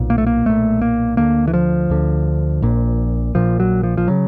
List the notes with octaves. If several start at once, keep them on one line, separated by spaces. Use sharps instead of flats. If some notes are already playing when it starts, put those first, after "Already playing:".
Already playing: B1 A#2
A#3
A3
A#3
B1 A#2 A3
A#3
D2 D3 A#3
E3
F3
D2 D3
A#1 A#2
A#1 A#2 F3
F#3
F3
F3
C#3 F#3